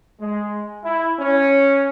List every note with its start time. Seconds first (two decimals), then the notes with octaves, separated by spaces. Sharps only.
0.20 G#3
0.84 E4
1.19 C#4